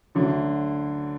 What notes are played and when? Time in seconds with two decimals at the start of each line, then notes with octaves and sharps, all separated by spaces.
0.15 D2 D3 F#3